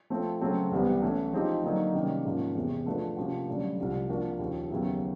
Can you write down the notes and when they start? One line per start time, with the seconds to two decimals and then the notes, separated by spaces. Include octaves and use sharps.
0.10 F3 A3 C4
0.41 C#3 F#3 A3 C4
0.71 C2 C3 E3 G3 B3
1.02 E3 A3 C#4
1.33 F3 G#3 C4 D#4 G4
1.64 D3 F#3 A#3 D#4
1.94 C3 D#3 G3 A#3 C#4
2.25 G#2 F3 A#3 C#4
2.55 E2 C3 E3
2.86 F3 A3 D4 F#4 B4
3.17 C3 F3 A#3 C#4 F#4
3.47 G2 D3 F#3 A3 C#4
3.78 C2 C3 F3
4.09 F3 A#3 D4 F#4 A#4
4.39 D#2 C#3 F3
4.70 D#2 C#3 F#3 B3 E4